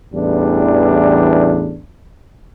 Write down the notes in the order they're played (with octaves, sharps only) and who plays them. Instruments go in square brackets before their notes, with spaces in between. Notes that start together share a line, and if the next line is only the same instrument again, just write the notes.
[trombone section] A1 E2 G3 D4